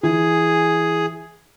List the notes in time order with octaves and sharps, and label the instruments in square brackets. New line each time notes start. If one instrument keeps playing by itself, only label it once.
[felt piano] E3 G#5 [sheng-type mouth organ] G#4